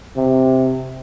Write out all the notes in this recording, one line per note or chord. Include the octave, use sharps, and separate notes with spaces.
C3